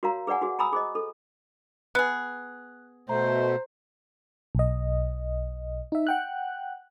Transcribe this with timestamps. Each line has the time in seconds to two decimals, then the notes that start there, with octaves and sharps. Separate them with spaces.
0.03 F#4 A#4 C#5 F5 A#5
0.27 G#4 B4 D5 F#5 G#5
0.41 F#4 G#4
0.59 G#5 A#5 B5 D#6 E6
0.73 G#4 C5 D#5
0.95 A4
1.95 B3 G#4 F#6
3.09 B2 A3 C5 A#5
4.55 B1 D#5
5.92 D#4 E5
6.07 F#5 G5 F#6